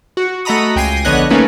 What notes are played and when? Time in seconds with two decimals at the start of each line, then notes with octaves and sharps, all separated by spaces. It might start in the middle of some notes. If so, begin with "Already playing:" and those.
0.17 F#4
0.45 A3 F#4 D#5 A#5 B5 D#6
0.76 C#2 G5 G#5 A#6 C7 D#7
1.05 A#1 D3 B3 C#5 D#5 F#6
1.30 A3 A#3 C#4 D#4 B4